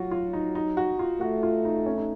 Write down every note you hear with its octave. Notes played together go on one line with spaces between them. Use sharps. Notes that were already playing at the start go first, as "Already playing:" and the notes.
Already playing: F#3 F4 F#4
F4
D#4
D#4
F#4
F4
A3 F#4
F4
D#4
C#4
D#4